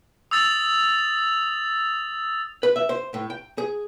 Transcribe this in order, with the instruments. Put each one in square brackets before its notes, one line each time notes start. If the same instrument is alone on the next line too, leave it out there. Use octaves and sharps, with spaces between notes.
[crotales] D#6 E6 A6 F7
[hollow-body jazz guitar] B4
E5
C5
A2
G5
G#4